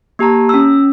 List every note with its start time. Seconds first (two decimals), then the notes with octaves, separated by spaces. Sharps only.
0.19 A#3 G4 A5 A#5
0.49 C#4 E6